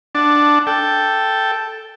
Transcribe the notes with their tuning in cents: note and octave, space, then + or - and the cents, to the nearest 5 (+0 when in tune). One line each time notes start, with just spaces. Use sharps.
D4 +5 F#5 +0 A5 +0
A4 +0 G5 +0